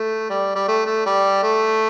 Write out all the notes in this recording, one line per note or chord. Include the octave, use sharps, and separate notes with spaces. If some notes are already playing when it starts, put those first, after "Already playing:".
Already playing: A3
G3
G3
A3
A3
G3
A3